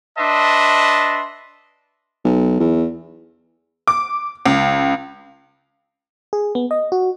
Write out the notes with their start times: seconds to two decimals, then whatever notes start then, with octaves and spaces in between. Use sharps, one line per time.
0.18 D4 B4 D#5 E5 A5 C6
2.24 B1
2.60 E2
3.88 D6
4.46 C#2
6.33 G#4
6.55 B3
6.71 D#5
6.92 F#4